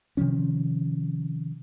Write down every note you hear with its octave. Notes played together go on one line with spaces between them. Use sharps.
C3 D#3 F3 C#4